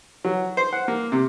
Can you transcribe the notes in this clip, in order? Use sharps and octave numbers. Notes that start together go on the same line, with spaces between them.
F#3
C5
F#5
A#3
C3